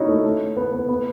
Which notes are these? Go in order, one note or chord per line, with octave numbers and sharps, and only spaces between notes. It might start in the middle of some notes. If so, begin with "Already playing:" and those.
Already playing: C#4 D#4 E4 F#4
A3
A3
B3
B3
B3